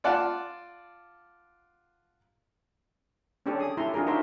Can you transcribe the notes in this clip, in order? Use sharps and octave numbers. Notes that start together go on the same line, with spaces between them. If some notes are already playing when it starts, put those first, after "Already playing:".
F4 D5 F#5 A5
C#4 D4 G4 A4 C#5 D5
G#4 D#6
E4 G4 A4 A#5 C6
D4 F4 G#4 A#4
D#4 F#4 A#4 C5 E5 C6